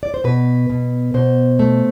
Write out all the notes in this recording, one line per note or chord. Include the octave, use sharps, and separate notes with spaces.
D5
C5
B2 B4
B2
B2 C5
A3